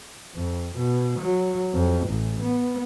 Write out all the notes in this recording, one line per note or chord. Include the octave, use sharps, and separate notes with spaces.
F2
B2
F#3
F2
A1
B3